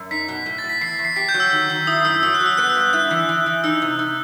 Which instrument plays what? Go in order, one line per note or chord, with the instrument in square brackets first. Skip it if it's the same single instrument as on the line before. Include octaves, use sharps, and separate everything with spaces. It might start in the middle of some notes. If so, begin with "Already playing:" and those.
Already playing: [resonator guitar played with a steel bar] F#2
[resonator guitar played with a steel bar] D#4 [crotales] B6
[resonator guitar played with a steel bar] B2
A2
[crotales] A6
[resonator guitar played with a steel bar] A2
[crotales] B6
[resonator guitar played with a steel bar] E2 [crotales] C7
[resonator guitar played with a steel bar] E2
[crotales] C7
[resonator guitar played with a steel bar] G4 [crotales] B6
[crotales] G6
[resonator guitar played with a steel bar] F#3
[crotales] E6
[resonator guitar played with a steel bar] D#3
D#3
[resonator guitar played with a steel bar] E4 [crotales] D#6
[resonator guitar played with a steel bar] F#2 [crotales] E6
[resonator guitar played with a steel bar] F#3 [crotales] E6
[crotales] F#6
[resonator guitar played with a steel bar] F#3
[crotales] E6
[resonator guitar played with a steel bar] B3 [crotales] F#6
[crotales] E6
[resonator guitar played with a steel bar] G2
[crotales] F#6
[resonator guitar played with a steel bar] E4 [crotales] F#6
[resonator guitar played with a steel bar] E3
E3
E3
[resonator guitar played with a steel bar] D#4 [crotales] E6
[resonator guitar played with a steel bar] C3
D#4